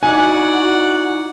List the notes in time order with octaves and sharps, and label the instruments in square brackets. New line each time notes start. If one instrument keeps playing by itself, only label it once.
[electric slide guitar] D#4 E4 [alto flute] F#4 [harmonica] D5 F#5 [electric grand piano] G#5